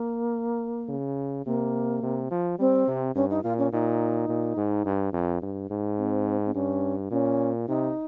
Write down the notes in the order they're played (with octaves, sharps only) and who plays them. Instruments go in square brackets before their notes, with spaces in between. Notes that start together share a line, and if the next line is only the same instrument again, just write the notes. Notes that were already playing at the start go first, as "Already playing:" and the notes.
Already playing: [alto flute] A#3
[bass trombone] C#3
[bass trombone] C3 [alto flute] A#3
[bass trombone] C3
F3
[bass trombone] G3 [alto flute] C4
[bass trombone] C3
[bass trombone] G2 [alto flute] C#4
[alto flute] D#4
[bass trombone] A#2 [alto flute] F4
[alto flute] C#4
[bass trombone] A#2 [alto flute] D#4
[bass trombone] A#2
G#2
G2
F2
G2
G#2
[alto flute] C4
C4
[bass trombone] G2 [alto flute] C#4
[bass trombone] A#2 [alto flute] C#4
[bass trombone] C3 [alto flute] D#4